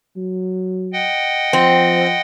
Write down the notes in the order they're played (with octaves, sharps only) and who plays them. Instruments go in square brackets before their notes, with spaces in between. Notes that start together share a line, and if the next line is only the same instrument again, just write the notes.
[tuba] F#3
[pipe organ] D#5 F#5 G5
[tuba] F3 [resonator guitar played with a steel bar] C4